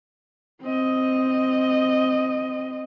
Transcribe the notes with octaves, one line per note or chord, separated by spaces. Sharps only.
C4 D#5